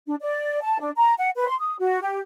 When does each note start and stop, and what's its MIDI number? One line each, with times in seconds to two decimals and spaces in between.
0.07 0.15 62
0.20 0.59 74
0.62 0.78 81
0.80 0.90 62
0.96 1.14 82
1.17 1.30 78
1.36 1.47 71
1.47 1.55 84
1.60 1.76 87
1.79 1.99 66
2.02 2.20 67